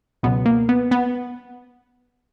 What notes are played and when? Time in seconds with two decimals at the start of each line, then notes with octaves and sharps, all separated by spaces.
0.23 C#2 B2 F#3 B3
0.46 A#3
0.69 B3
0.91 B3